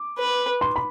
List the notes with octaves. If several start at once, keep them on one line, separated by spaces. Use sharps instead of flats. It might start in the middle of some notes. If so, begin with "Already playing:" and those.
Already playing: D6
B4
C6
B5